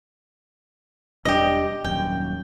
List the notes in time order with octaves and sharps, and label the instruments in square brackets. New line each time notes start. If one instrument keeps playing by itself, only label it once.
[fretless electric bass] E1 G3 D4 [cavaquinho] G4 D#5
[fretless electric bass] D#1 F#2 [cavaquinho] G5